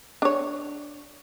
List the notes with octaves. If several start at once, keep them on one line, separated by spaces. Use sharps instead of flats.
D4 C#5